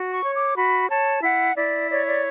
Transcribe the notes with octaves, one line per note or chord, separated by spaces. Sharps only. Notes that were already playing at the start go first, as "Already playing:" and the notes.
Already playing: F#4
C#6
C#5
D6
F#4 B5
C#5 A5
E4 F#5
E4 D5
C#5 D5
D5